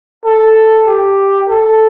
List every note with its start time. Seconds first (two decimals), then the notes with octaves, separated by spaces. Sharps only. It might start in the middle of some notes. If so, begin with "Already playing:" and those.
0.25 A4
0.87 G4
1.49 A4